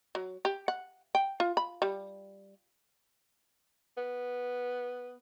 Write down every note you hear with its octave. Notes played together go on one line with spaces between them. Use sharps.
F#3
G4
F#5
G5
F4
B5
G3
B3